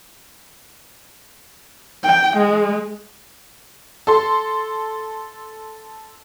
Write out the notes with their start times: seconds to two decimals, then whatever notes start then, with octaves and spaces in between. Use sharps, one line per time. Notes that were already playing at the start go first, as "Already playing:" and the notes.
2.03 G5
2.37 G#3
4.07 A4 C6